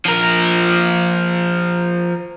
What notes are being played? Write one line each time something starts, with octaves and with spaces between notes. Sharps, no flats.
F3 A#4